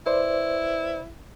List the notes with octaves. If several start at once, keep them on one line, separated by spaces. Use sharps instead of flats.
E4 B4 C5 D5